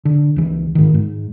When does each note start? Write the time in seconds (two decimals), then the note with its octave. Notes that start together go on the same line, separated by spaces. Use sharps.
0.05 D3
0.36 C#2 E3
0.75 G#2 D#3
0.94 G#2